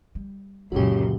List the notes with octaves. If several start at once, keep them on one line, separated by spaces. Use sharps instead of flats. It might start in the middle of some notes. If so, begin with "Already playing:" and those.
G3
C#2 F#2 A#2 D3 F#4 G4